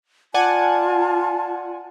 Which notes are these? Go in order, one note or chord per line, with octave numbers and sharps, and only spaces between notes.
F4 D5 F#5 G#5 A5